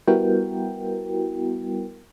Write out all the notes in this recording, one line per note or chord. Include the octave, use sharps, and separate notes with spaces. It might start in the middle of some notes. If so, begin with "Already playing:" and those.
G3 B3 E4 F#4 A#4 G5